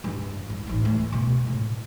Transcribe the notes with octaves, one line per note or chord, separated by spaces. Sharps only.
G2
G2
A1 D#4
E3 A3
G2 B2
A2